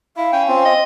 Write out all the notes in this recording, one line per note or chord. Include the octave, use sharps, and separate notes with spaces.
E4 F5
C#4 G5
C4 F4
D#5